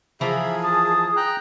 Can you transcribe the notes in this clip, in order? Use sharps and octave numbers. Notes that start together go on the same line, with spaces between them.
E3 F3 G#4 A#4 E5 B5
A5 D#6
G5 A#5 F#6